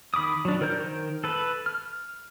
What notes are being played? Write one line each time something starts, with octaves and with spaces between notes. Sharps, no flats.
D#3 B5 D6 D#6
F#3 D4
D#3 A#4 C5 A#5 G6
A4 B4
F6